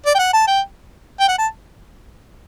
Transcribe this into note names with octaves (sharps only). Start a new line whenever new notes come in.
D5
G5
F#5
A5
G5
G5
F#5
A5